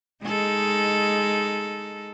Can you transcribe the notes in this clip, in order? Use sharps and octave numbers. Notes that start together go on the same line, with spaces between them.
G#3 D#4 A4